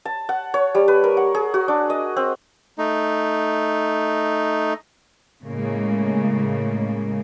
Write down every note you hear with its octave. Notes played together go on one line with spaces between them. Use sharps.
A5
F#5
C#5
G3
B4
A#4
F#5
G#4
F#4
D4
D#5
C4
A3 D#4
A2 C#3 G#3 A#3